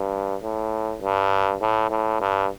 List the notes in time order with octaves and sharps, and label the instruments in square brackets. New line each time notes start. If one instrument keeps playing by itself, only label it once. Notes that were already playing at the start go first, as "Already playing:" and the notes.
Already playing: [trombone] G2
A2
G2
A2
A2
G2